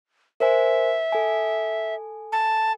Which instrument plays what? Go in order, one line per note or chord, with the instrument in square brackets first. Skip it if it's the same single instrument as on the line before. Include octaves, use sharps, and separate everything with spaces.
[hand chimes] A#4 C5 G#5 [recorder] E5
[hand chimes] A4 G#5
[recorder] A5